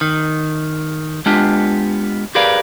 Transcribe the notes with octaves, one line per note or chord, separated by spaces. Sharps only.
D#3
G#3 B3 D4 F4 G4
G4 G#4 A#4 B4 D5 F5